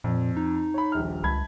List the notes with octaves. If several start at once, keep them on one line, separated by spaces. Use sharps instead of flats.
F2 A#2
D#4
C#5 B5
D#1 A#1 F6
C#2 A5 B5 G#6